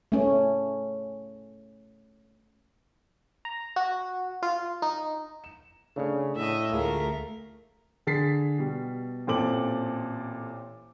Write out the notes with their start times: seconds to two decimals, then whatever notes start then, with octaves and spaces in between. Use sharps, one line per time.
0.12 A3 C#4
3.45 A#5
3.76 F#4
4.43 F4
4.82 D#4
5.44 E7
5.96 C#3 A3 D4 C#5
6.36 A2 D#5 E5
6.72 D2 A3 F4 G#4 A#4
8.07 D3 G#4 A6 B6 C7
8.58 B2 G3
9.27 A1 A#2 C4 A4 D6 F#7